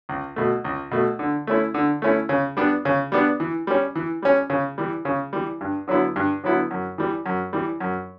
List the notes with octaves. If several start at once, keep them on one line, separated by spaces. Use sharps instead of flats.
C#2
B2 A3
C#2
B2 A3
D3
A3 C#4 E4
D3
A3 C#4 E4
C#3
G3 B3 D4
C#3
G3 B3 D4
E3
G3 C#4
E3
G3 C#4
C#3
E3 G3
C#3
E3 G3
G2
D3 F#3 B3 E4
G2
D3 F#3 B3 E4
F#2
E3 G3
F#2
E3 G3
F#2